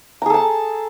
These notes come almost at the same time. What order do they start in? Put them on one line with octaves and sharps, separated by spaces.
A#5 G#4 A4 A5